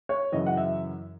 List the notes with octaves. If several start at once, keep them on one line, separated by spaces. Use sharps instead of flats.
C#5
F#2 C#3 E3 D#5
F#5
E5